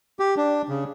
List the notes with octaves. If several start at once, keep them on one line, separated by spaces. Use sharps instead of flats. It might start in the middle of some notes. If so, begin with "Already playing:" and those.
G4
D4
C#3